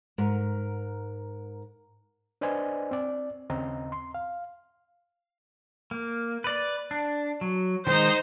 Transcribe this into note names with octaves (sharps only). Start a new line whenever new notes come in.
G#2 A#4
D4 B4 C5 D5 D#5 G#5
C4 D5
D#2 C#3 C4 D#5 A#5
C6
F5
A#3
B4 D5
D4
F#3
D#3 G#3 D#4 C5